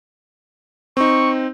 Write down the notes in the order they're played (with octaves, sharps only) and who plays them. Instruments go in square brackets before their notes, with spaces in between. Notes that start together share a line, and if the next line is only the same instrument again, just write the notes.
[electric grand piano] C4 D#4 [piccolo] C#6